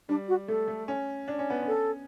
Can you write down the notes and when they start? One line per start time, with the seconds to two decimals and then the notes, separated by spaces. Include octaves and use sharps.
0.09 G3 D4
0.28 F#4
0.48 A3 A4
0.68 A3
0.88 C#4
1.28 D4
1.39 C#4
1.50 B3
1.62 C#4
1.67 A4